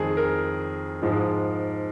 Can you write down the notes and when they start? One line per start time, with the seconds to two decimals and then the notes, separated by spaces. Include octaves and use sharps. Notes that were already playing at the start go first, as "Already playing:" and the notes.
Already playing: F2 D#3 G#3 G#4
0.17 A#4
1.02 G#2 F3 G#3